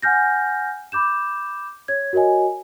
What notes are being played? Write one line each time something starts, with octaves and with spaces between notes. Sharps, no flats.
F#5 G#5 F6 G6 A#6
B5 D6 G6 E7
C#5 G#6
F#4 A#4 C#5 D#5 G#5